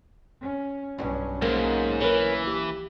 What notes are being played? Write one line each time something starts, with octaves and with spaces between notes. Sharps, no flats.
C#4
B1 E2 G2 F#3 C#4
D2 G#2 G#3 A#3
E3 A#4 B4 C#5
G4